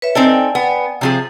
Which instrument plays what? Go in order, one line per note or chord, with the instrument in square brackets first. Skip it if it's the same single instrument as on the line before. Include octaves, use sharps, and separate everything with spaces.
[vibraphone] B4 C#5 E5
[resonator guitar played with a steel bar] C4 D#4 A4 [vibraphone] D5 G5 G#5
[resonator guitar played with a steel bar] B3
C3 F3 G#4